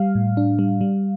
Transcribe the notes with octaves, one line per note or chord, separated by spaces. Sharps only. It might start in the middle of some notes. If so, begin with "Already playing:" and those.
Already playing: G3 F5
A2
D4
G3
G3